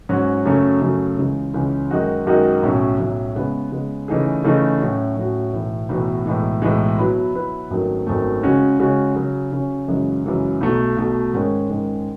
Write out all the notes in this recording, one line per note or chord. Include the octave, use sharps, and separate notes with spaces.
G#2 F#3 C#4 F#4
F#2 C#3 F#3 A3 C#4
F#2 C#3 F#3 A3 C#4
C#2 C#3 E3 G#3
C#2 C#3 E3 G#3
F#2 D#3 G#3 D#4 F#4
F#2 D#3 G#3 D#4 F#4
B1 A2 F#3 C#4
B1 A2 F#3 C#4
C#3 G#3 B3
C#3 G#3 B3
C#3 E3 A3 D#4 G#4
C#3 E3 A3 D#4 G#4
A2 F#3 C#4 F#4
A2 F#3 C#4 F#4
B1 A2 E3 B3 F#4
B1 A2 E3 B3 F#4
B1 A2 E3 G#3
B1 A2 E3 G#3
B2 F#3 B3 E4 B4
B2 F#3 B3 E4 B4
G#1 F#2 D#3 F#3 A3
G#1 F#2 D#3 F#3 A3
C#3 G#3 C#4 F#4
C#3 G#3 C#4 F#4
C#3 F#3 C#4
C#3 F#3 C#4
F#2 C#3 E3 G#3
F#2 C#3 E3 G#3
B1 B2 A3
B1 B2 A3
G#2 D#3 G#3 C#4
G#2 D#3 G#3 C#4